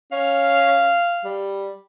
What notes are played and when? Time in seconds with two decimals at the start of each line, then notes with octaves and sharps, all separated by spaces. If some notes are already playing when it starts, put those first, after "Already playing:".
0.12 C#4 F5
1.24 G3